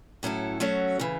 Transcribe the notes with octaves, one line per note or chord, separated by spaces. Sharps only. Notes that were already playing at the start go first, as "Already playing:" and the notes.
A2 F#3 C#4 E4 A4
F#3 A3 C#4 F#4 C#5
C#3 E3